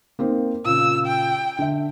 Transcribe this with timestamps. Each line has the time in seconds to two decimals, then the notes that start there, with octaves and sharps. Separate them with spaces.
0.19 A#3 C4 D#4
0.65 A#2 C#3 E6
1.06 G5
1.59 D3 E5